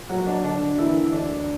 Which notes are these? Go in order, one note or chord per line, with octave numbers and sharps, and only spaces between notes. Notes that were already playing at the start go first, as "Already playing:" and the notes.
Already playing: A#2
F#3 A#3 F#4
D4
D3 D4
E3 A#3 E4
D2 D4